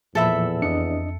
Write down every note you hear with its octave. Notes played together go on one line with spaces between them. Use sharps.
E2 A#2 F3 A4 E5 B5
F2 D4 D#5 C#7